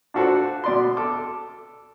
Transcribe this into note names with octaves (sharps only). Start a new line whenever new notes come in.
D4 F4 F#4 A4 C5 F#5
B2 D5 C6
A4 D6